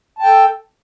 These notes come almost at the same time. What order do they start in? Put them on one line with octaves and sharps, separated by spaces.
A5 G5 A4